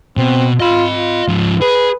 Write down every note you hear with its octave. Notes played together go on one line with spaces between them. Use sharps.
B2 C4
F4 D#5 B5
F4
G#2 F3
G#4 B4